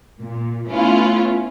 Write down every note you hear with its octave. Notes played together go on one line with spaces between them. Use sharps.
A#2
A3 B3 C#4 E4 F4